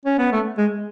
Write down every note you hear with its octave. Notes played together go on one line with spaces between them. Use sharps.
C#4
B3
A3
G#3